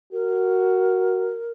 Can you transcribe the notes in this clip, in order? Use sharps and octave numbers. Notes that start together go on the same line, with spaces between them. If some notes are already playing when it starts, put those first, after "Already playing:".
F#4 A#4